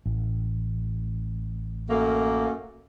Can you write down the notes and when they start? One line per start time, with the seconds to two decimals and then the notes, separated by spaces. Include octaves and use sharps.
0.06 A1
1.89 F#2 A3 A#3